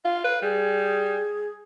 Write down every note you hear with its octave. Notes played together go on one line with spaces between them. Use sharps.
F4 F5
B4
G3 G#4